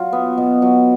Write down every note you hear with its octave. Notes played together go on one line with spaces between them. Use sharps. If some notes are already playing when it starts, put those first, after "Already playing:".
Already playing: F#3 F4
B3
B2
F#3